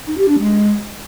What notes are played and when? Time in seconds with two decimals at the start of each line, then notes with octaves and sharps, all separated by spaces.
0.07 D#4
0.17 G4
0.28 D4
0.38 G#3